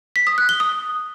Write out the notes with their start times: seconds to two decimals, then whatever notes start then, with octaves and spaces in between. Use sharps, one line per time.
0.16 B6
0.27 D#6
0.38 F#6
0.49 G7
0.60 D#6